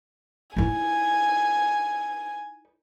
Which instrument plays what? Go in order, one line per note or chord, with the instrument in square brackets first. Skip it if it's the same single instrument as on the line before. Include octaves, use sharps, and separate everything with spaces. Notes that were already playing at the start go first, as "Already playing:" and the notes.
[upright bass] D#4 E4 [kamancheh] G#5